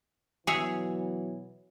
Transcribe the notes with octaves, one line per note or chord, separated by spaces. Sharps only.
B2 E3 F#3 G#4 C#5 E5